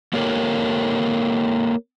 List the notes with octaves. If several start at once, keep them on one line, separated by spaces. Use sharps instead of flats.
A#3 G4 A4 A#4 C#5